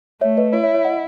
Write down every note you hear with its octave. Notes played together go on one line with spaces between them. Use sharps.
A3 C#5 E5
B4 D#5
E4 C#5
C#5 E5
C#5 E5
D#5 F#5